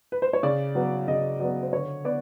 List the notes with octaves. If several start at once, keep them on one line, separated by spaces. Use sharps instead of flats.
B4
C5
C#5
C#3 D5
F#3 B3
C#3 D#5
F#3 B3 D5
C5
D3 C#5
B3 D5